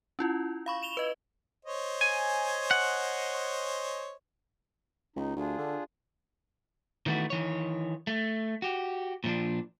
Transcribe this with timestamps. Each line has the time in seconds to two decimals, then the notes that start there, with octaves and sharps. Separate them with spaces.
0.19 C#4 E4 F4
0.66 F5 B5 C#6
0.83 E7 F7 G7
0.97 B4 D#5
1.65 C5 C#5 D#5
2.01 G#5
2.71 F#5
5.16 C#2 D#4
5.36 D2 D4 F4 G#4
5.59 D3
7.06 D#3 E3 A3 B3 F#4
7.30 D#3 E3 C#5
8.07 A3
8.62 F#4 G4
9.24 A#2 F3 D4